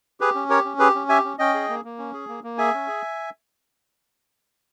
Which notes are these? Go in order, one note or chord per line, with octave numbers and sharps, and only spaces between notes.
G4 G#4 B4
C#4
G4 A#4 C#5
C#4
G4 G#4 B4
C#4
G4 E5 G#5
C#4
C#4 D#5 G5
G#4
A#3
A#3
C#4
G#4
A#3
A#3
G#4 E5 G#5
C#4
G#4